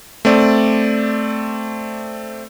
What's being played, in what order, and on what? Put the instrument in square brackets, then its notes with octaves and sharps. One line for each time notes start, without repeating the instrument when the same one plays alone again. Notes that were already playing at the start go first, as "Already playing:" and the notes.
[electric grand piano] A3 C4 D5